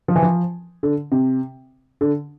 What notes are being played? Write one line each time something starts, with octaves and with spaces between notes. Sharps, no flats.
F3
E3
F3
D3
C3
D3